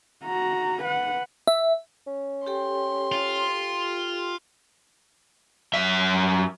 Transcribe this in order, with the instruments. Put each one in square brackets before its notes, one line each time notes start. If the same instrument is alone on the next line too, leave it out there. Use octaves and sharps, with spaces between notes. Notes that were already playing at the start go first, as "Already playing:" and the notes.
[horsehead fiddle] F#4 A#5
B4 F#5
[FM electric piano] E5
[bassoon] C#4
[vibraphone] G4 A4 G5 [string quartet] C6
[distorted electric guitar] F4
[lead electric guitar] F#2 E5